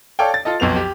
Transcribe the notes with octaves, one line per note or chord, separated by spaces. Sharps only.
A4 C#5 D5 F5 G5
A6
F4 A4 D#5
B1 F2 B3 F7
G4